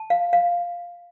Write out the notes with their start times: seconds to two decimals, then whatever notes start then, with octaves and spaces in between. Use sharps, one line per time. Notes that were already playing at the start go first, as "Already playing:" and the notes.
Already playing: A5
0.10 F5
0.33 F5